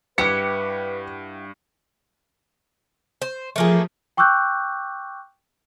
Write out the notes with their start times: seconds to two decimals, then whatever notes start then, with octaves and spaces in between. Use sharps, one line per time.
0.18 G2 E4 G4 B4 F#5 C#7
3.22 C5
3.56 F3 A3 A#3 G#4
4.17 G5 C#6 D6 E6 F#6 G6